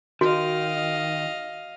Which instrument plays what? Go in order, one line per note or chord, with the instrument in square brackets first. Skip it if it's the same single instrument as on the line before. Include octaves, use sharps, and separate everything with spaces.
[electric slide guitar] D#3 [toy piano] F#4 [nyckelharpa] D#5 F5